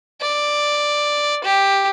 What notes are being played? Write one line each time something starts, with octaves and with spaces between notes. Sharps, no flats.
D5
G4